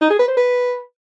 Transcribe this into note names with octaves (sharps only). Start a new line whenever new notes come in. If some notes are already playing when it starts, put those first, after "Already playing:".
D#4
G#4
B4
C5
B4